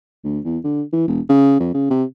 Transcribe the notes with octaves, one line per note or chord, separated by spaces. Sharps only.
D2
E2
D3
E3
E1
C#3
F2
C#3
C3